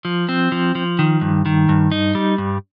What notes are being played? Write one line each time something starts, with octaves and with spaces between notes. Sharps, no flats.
F3
C4
F3
F3
D#3
G2
D#3
G2
D#4
G3
G2